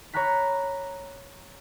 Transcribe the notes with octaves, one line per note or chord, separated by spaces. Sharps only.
C#5 A#5 B5 F#6 B6